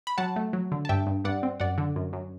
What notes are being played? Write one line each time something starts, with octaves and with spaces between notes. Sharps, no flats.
B5
F#3 F#5 A5
A3
F#3
D3
A5
G2 E5 G5
G2
G2 D5 F#5
C4
F#2 D5 F#5
D3
F#2
F#2